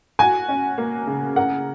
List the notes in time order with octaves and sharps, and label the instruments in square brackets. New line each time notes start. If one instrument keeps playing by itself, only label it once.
[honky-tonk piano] F#4 [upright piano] G#5
[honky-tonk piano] C#4
A#3
C#3
[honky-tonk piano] A#4 [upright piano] F#5